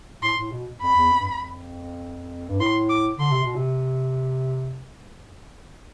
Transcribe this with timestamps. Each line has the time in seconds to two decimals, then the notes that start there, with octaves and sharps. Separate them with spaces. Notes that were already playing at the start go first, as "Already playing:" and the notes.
0.22 A2 C6
0.38 A2
0.52 B2
0.82 F2 B5
0.96 E2
1.11 F2
1.20 G2
1.27 F2
2.49 G2
2.59 A2 C6
2.89 D6
3.19 D3 C6
3.32 C3
3.44 B2
3.56 C3